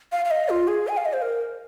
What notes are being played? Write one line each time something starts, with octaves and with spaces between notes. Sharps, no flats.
F5
F5
D#5
F4
G#4
G#5
F5
D#5
C5
A#4